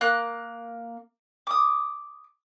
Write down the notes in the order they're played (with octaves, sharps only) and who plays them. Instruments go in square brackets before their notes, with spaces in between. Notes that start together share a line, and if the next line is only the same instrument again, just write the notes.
[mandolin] A#3 F#6
D6 D#6